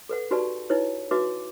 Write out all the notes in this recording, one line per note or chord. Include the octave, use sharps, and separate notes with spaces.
A4 B4 F#5
D#4 F#4 G4 B4 D5 A5
D#4 E4 B4 C#5
D#4 F#4 B4 E5 D6